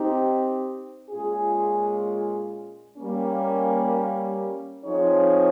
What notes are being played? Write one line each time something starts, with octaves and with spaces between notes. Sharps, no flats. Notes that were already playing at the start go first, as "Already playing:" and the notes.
Already playing: C4 D#4 G4
A#2 G#3 C#4 F4 G#4
G3 A#3 C#4
F3 C4 D#4 G#4 C#5